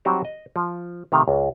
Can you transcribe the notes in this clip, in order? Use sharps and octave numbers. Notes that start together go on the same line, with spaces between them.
F#3 G3 C4 D#4 F#4 G4
D#5
F3
C3 D#3 A3 F5
C#2